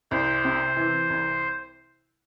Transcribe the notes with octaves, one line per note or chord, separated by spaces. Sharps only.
C2 C5
C3
E3
C2